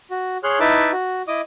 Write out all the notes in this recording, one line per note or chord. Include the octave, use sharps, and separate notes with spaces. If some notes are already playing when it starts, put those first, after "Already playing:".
F#4
G#4 C#5 C6 F6 F#6
D#4 E4 B4 E5 A5 D6
F#4
E4 D#5 D6 D#6